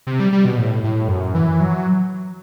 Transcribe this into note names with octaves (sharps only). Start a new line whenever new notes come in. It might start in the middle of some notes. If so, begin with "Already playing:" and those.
C3
G3
G3
B2
A2
A2
F#2
E3
F#3